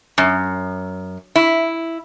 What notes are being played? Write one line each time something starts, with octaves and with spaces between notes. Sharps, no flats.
F#2
E4